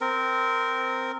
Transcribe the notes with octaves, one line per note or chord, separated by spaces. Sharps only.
C4 A#4